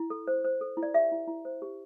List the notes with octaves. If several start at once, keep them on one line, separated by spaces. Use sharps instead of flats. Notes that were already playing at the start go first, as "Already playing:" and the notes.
Already playing: E4
A4
C5
C5
A4
E4
D5
G4 E5
E4
E4
C5
G4